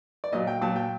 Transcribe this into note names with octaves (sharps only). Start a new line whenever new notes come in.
D5
A#2 F#3 D#5
G5
A#2 F#3 A5
G5